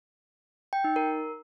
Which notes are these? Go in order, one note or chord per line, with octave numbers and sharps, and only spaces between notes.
G5
D#4
A#4